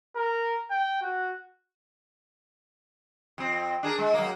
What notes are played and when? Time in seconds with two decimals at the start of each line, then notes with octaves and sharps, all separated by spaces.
0.16 A#4
0.71 G5
1.02 F#4
3.38 F2 C4
3.83 D4 G#4 A#4
3.98 G#3
4.14 F#3 G#3 A#3